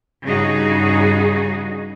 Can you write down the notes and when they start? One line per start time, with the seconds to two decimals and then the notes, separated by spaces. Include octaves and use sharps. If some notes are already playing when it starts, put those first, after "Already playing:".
0.24 G2 C#3 G3 D#4 F#4 G#4